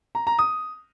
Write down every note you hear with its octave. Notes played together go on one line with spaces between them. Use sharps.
A#5
A#5
D#6